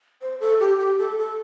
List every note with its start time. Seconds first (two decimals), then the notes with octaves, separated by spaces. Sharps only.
0.22 C5
0.40 A4
0.60 G4
0.79 G4
0.99 A4
1.18 A4